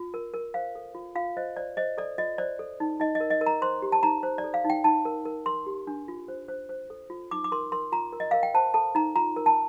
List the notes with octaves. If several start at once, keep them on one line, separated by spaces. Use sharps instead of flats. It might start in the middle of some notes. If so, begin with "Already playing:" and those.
Already playing: F4
A#4
A#4
C5 F5
A4
F4
F4 F5
C5 D#5
C5 D5
C5 D#5
A4 D5
F4 D#5
C5 D5
A4
D#4
D#4 D#5
D#5
A#4
D#5
A#4
A#5
C5 C6
G4
A5
D#4 A#5
C5
D5
A4
F5
D#4
G5
D#4 A5
A#4
A#4
A#4 C6
G4
D4
F4
C5
C5
C5
A4
F4
D#4 D6
D6
A#4 C6
A#4 C6
F4 A#5
A#4
D#5
A#4 F5
G5
C5 A5
A4 A5
D#4 A#5
F4 A#5
A#4
A5